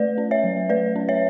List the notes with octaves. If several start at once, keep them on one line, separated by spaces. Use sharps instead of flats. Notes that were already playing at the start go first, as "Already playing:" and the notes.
Already playing: A3 B4 D5
C#4
C#5 E5
F#3
A3 B4 D5
C#4
C#5 E5